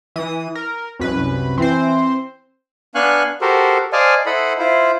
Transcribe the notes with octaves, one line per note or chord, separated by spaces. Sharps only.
E3 D#6
A#4
C2 F#2 B4
E3 C4 C5
B3 D4 F5 G#5 C#6 F#6
F#4 G4 A4 A#4 C5
C5 D5 D#5 F5 G#5 A5
E4 A4 C5 D#5 F#5 B5
E4 F4 C5